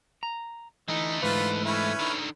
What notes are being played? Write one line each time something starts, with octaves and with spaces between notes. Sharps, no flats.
A#5
D3 E3 A3 D#4
G#2 E3 F4 B4
C#4 E4 B4
D3 D#3